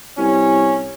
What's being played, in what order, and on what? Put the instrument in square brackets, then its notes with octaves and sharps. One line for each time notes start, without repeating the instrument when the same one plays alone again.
[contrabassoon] C2 [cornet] C#4